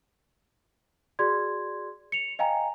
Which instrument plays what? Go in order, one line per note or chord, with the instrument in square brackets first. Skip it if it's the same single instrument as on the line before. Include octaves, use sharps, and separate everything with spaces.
[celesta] F#4 G#4 D5 C6 G#6
C#7 F7
D#5 F5 G5 G#5 A#5